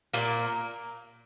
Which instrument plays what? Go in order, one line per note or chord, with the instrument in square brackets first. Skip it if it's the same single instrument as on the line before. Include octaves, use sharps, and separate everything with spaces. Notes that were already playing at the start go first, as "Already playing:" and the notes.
[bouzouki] A#2 A#3